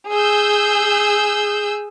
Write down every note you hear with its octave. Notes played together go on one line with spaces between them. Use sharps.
G#4 E6 G6